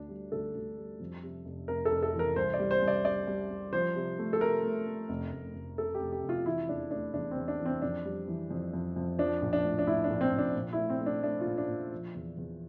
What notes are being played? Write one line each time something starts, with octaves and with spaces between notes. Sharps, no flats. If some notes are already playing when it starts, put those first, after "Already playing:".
Already playing: D2 D3 D4
G3
D2 A4
D2
G3
F2
C3
F1
F1 A#4
A4
F1
A4
E3
A#4
C2 C5
D5
G3
C5
C2
D5
G3 D5
G3
G3
F3 C5
C3
A3
A4
C3 A#4
A3
A3
F1
F1
F1
F1 A4
G4
F1
G4
F1
F4
E3 E4
E2 D4
A3 D4
E2 D4
C4
E2
D4
E3
C4
F2 D4
G3
E3
F2
F2
F2
F3 D4
A#1
D4
A2
D4
A2 E4
D4
A#1
C4
A#1
D4
A#2
A3 E4
C4
A3
D4
A3 D4
F4
A#2
D4
A#2
F3
E2
E2